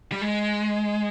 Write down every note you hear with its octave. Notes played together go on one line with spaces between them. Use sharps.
G3
G#3